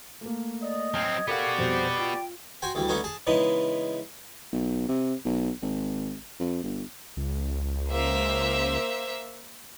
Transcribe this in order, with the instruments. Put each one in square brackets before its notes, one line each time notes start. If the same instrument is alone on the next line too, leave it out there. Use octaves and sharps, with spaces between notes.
[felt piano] A3 A#3
[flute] D5 [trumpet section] D#5
[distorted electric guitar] F#3 C4 [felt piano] F6 [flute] G#6
[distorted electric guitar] B3 F#4 [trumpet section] G4 D5 [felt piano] A4 A#4 F5
[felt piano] F2 B2 G3 [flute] C5
[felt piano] F4 [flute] G5
[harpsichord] F#4 C5 G5 G#5
D2 E3 G3
D3 A3 B3 C#4 D#4
G#4 A5
C#3 E3 G#3 B3 D#4
[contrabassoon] B1
C3
B1
G#1
F2
G1
[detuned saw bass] C#2
[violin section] A#3 C5 E5